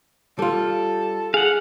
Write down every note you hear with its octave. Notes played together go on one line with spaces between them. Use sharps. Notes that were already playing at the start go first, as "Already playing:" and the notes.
G3 F4 A4
G#4 F5 F#5